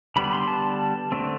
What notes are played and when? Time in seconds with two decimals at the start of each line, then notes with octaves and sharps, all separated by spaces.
0.16 D3 G3 B3 B5
0.33 C6
0.48 A5
1.12 D3 A3 C4